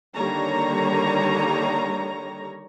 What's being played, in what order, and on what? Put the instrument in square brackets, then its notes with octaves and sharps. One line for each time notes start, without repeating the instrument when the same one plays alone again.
[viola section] D3 D#3 G3 A#3 C#5 A#5